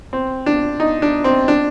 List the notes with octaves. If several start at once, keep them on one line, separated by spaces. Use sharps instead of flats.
C4
D4
D#4
D4
C4
D4